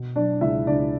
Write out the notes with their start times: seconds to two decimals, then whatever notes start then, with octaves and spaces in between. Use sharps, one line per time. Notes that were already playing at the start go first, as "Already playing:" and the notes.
Already playing: B2
0.16 F#3 D4 D5
0.41 C#2 E4 E5
0.67 C#2 D4 D5